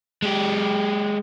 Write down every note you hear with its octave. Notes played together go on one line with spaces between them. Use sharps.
G#3 G4